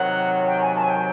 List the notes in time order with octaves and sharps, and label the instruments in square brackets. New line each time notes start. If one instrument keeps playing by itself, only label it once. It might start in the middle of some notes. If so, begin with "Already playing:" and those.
Already playing: [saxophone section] C3 D#3 F#3 [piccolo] F#5
[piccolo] G5
G#5
A5
G#5
G5